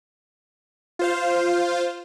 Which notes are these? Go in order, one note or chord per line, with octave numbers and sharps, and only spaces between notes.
F4 C5 F5